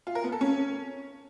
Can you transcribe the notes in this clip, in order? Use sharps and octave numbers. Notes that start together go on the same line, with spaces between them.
F4
A#4
B3
A4
C#4